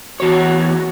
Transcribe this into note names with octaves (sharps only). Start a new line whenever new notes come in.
E2 F#4 C#5